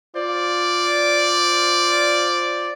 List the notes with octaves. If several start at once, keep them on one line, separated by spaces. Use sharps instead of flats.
F4 C5 D5